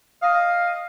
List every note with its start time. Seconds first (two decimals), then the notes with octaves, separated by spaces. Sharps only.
0.23 D#5 F5